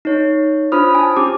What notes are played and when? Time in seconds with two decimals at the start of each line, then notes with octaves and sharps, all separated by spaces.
0.05 D#4 C#5
0.72 D4 F4 C5 B5 D#6 F6
0.95 G#5 A5
1.16 C#4 G4 D6